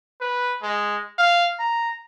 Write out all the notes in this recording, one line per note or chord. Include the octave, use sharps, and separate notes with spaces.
B4
G#3
F5
A#5